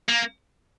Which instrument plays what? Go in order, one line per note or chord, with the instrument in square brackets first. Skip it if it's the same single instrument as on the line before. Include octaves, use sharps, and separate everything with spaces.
[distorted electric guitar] A#3